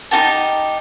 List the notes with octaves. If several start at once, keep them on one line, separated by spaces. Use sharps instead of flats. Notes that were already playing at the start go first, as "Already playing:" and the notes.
D#4 F#4 G4 A5